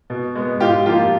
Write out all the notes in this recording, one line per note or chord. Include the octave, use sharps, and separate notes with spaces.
B2
G#3 B3
G#2 F4 G4
F3 A#3 F4 G4